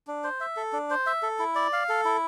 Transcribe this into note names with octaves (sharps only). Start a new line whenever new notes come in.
D4
C5
E5
A4
D4
C5
E5
A4
E4
D5
F5
A4
E4